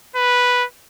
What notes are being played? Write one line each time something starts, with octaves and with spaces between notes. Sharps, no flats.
B4